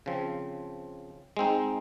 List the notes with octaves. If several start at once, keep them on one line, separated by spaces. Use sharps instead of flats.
C#3 F3 C4
G#3 C4 D#4